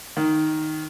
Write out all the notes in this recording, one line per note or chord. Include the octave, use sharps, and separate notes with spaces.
D#3